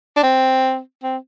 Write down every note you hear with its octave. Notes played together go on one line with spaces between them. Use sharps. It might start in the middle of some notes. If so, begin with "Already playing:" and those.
D4
C4
C4